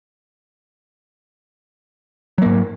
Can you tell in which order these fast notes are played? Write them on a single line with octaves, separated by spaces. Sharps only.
F#3 A#3 G#2